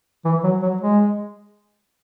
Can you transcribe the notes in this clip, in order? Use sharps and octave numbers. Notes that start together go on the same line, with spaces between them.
E3
F#3
F#3
G#3